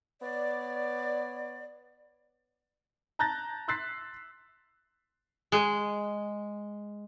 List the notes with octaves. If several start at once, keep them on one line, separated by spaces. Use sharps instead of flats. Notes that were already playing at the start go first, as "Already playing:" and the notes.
B3 C#5 D5
A5 A#5 F#6 G6 A6 A#6
C6 E6 F#6 A6 B6 C7
G#3